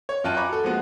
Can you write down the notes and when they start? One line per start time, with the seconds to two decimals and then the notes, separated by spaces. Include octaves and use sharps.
0.09 C#5
0.24 F#2 F4 G5 A5 F#6 D#7
0.37 G#5 A#5 B5 C#6 D6
0.49 F#4 A4
0.64 F3 G#3 A#3 B3 F#4